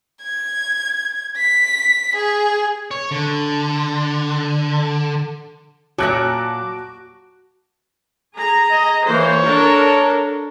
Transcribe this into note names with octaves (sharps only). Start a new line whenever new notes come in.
G#6
B6
G#4
C#5
D3
A#2 F#3 F#4 A5 D6 F#6 A#6
G#4 A#5
D#5
E3 A#3 C5 C#5
D4 A4 A#4